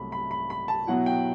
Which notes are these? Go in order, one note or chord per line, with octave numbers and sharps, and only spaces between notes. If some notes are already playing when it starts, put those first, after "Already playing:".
Already playing: C2 C3 F#3 A3 B5
B5
B5
B5
A5
B2 F#3 B3 E4 F#5
G5